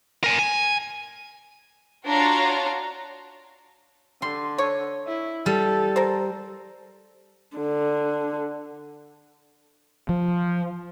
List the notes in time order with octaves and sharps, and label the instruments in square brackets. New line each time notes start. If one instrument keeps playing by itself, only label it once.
[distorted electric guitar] A#4 G#5
G#5
[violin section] D4 F4 F#4 C#5 F5 A#5
[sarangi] D3 [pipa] G3 [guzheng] C6
[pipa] C#5
[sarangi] E4
[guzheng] G3 [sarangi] A4
[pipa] A#4 C5
[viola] D3
[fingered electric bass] F3